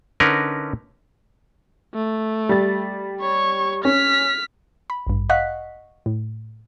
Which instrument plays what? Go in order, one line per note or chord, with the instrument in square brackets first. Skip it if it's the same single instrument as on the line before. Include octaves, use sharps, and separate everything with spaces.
[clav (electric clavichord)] D3 C#4 D#4 A#4 B4
[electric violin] A3
[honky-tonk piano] G3 A6
[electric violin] C#5 C#6
[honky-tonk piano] C#4 [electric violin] F6 B6
[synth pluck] B5
A1 G2
D#5 F5 F#5 C#6 F#6 B6
A2